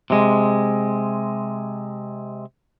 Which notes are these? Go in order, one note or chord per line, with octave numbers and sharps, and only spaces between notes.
C3 G#3